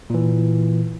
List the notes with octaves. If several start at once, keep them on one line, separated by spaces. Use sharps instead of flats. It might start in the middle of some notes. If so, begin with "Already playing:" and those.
A#2 E3